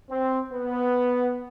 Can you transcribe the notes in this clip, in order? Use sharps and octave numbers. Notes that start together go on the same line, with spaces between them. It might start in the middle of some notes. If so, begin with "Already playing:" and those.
C4
B3